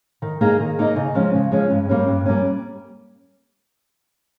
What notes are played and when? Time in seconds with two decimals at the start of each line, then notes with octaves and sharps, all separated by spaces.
0.22 D#3
0.41 A#3 D#4 G#4 D#5
0.60 D#3
0.79 A#3 D#4 G#4 D#5
0.96 C#3
1.15 F3 G#3 C#4
1.34 C#3
1.51 F3 G#3 C#4
1.70 G2
1.89 G3 A#3 C#4
2.08 G2
2.26 G3 A#3 C#4